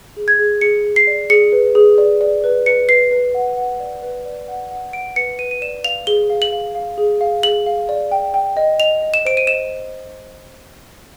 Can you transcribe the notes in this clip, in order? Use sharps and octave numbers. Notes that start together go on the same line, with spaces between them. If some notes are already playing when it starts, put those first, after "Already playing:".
G#4
G#6
G#4
G#4 C#7
G#4
C7
D5
G#4 C#7
B4
G#4
D5
D5
B4
B4 C#7
B4 C7
B4
F#5
F#5
D5
B4
D5
F#5
F#5
F#5 D7
B4 C#7
B4 D#7
D#7
D5 E7
F5 F7
G#4 G7
F5
F#7
F5
F5
G#4
F5
G#4 F#7
F5
D5
G5
G5
D#5
D#5 F7
D#5
E7
C5 D7
D#7
D#5 E7